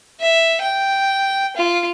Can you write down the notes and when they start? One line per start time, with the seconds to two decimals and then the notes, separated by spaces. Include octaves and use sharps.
0.20 E5
0.61 G5
1.56 F4